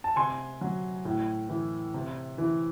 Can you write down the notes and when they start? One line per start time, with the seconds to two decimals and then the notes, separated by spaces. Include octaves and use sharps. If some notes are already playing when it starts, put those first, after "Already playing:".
0.04 A5
0.16 C3 G#5 C6
0.61 F#3
1.05 A2
1.49 E3
1.94 C3
2.38 E3